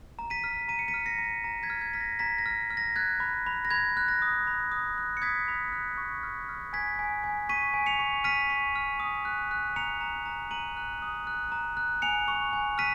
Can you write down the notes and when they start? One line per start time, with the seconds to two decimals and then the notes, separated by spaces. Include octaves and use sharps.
0.19 A#5
0.30 B6 D#7
0.44 F6
0.68 A#5 D#7
0.79 C#7
0.88 B6 D#7
0.94 F6
1.06 A#6 C#7
1.18 A#5
1.44 A#5
1.63 G#6 B6
1.70 F6
1.81 G#6
1.94 F6 B6
2.01 A#6
2.19 A#5 G#6 B6
2.38 A#6
2.46 F6
2.70 F6
2.77 A#6
2.96 F#6 G#6
3.20 B5
3.46 B5
3.65 A#6
3.70 B5 G#6
3.97 F#6
4.08 A#6
4.22 D#6
4.47 B5
4.72 D#6
4.98 F#6
5.17 C#7
5.22 D#6 G#6 B6
5.48 B5
5.72 F#6
5.98 C#6
6.23 F6
6.49 F6
6.73 G#5 G#6 B6
6.99 G#5
7.24 G#5
7.49 C#6 B6 D#7
7.74 G#5
7.86 C#7 F7
7.99 C#6
8.24 F6 B6 D#7
8.50 C#6
8.75 F6
9.00 D#6
9.25 F#6
9.51 F#6
9.76 A#5 C#7 F7
10.01 A#5
10.26 A#5
10.51 A#5 D#7 F#7
10.77 F#6
11.02 D#6
11.27 F#6
11.52 A#5
11.77 F#6
12.02 G#5 C#7 F7
12.28 C#6
12.53 G#5
12.78 F6 B6 D#7